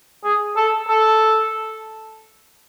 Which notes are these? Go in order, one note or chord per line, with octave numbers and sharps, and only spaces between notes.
G#4
A4
A4